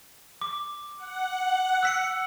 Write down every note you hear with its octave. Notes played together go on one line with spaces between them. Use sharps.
D6
F#5
E6 B6 C#7